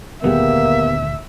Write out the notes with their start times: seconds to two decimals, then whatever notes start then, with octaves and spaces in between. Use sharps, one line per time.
0.24 D2 A#2 D#3 A#3 B3 G4 G#4 E5